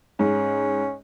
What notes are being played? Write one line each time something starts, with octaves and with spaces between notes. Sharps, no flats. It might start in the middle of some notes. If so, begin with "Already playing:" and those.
G#2 C#4